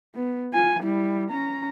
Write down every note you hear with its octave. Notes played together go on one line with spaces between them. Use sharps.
B3
F4 G#5
G3 E4
C#4 A#5